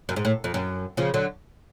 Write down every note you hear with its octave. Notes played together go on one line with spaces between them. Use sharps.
F#2
G#2
A2
F2
F#2
C#3 F3
D3 F#3